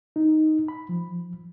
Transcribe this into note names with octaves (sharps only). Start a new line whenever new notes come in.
D#4
B5
F3